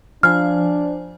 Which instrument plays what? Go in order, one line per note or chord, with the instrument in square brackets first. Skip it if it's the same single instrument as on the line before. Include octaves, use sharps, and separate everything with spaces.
[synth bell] F3 C5 G#5 [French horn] D4 [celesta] F6